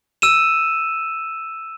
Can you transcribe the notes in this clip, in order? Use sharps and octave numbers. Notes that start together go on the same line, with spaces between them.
E6 D#7 E7